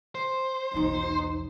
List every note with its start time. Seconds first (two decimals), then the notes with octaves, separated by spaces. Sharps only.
0.15 C5
0.74 B1 E2 D#4